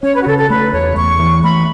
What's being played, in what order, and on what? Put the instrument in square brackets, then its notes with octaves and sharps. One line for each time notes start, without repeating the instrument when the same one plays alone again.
[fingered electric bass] C#4 [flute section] C#5
[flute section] B4
F#4
[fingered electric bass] C#3 [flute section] A4
[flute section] A4
[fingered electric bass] A3 [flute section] B4
[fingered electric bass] E2 [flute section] C#5
[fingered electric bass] E2 [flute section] C#6
[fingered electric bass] E3
[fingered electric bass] A3 [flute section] B5